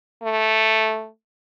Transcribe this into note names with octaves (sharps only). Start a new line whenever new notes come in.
A3